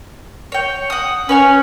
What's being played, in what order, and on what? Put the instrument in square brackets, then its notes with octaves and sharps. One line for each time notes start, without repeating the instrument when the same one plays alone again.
[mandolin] C#5 G5
F#5 D#6
[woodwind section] C#4 [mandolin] B4 C#5 G#5